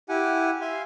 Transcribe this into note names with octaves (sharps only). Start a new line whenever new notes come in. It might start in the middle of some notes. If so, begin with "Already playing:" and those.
E4 G4 F#5 G#5
E5 F5 G#5 C6